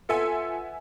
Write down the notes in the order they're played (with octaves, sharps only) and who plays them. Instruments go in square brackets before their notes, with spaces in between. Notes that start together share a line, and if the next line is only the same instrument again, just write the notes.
[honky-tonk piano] B3 E5 G#5 [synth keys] F4 A4 C#7